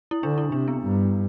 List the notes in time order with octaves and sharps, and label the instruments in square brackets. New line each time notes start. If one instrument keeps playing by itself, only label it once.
[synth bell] E4
[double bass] D3 [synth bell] D4
[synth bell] E4
[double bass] C3 [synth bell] D4
[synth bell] B3
[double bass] G2